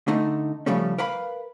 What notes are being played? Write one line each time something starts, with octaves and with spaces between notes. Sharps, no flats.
D3 A3 D#4
C#3 F3 G3 A3 C#4
A#4 B4 F5 B5